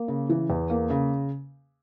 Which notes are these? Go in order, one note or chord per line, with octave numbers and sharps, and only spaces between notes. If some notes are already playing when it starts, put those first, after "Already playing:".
Already playing: A#3
C#3
E3
E2
A#3
C#3